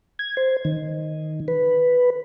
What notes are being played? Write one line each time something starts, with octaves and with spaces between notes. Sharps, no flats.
G#6
C5
D#3
B4